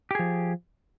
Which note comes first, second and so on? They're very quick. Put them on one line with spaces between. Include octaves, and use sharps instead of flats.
G4 G#4 F3